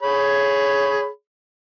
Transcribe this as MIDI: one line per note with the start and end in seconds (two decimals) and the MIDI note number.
0.02 1.08 68
0.02 1.08 73
0.02 1.08 83